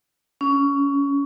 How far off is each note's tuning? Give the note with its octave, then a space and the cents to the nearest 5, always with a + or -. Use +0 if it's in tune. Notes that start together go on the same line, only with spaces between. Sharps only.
C#4 +20